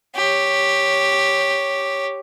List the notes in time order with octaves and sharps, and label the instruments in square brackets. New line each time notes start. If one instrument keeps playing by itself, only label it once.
[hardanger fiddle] G4 C#5